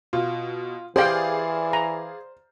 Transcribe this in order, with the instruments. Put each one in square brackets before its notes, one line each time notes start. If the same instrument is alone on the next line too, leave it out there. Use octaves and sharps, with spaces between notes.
[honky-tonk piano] B2 [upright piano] F4
[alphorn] E3 [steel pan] G4 G5 [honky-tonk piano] G#4 D5 F5 [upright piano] C5
[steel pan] A#5